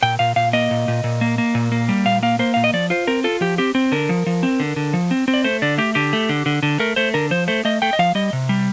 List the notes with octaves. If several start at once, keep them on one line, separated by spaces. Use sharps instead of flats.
A#2 G5
A#2 F5
A#2 F5
A#3 D#5
A#2
A#2
A#2
A#3
A#3
A#2
A#3
G3
A#2 F5
A#3 F5
A#3 C5
A#2 F5
D#5
F3 D5
F4 C5
C4 A#4
F4 A4
F3 G4
C4 G4
C4
D3 A#4
F3
F3
C4
D3
D3
F3
C4
C4
D5
A3 C5
D3 D5
A3 G4
D3 G4
A3
D3
D3
D3
A3 A#4
A3 C5
D3 A#4
F3 C5
A3 C5
A3 D#5
A3 G5
D#5
F3 F5
G3 D#5
C3
G3